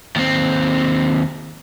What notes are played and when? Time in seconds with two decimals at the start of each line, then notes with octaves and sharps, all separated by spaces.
0.16 D#2 C4